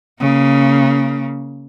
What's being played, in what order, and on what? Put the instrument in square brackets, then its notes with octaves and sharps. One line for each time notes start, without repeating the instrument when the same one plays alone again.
[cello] C#3 A#3